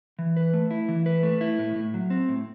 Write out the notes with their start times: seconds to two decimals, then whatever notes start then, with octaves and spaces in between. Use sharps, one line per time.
0.19 E3
0.36 B4
0.54 A3
0.71 E4
0.88 E3
1.06 B4
1.23 A3
1.41 E4
1.59 A2
1.75 A2
1.94 F#3
2.10 C4
2.29 A2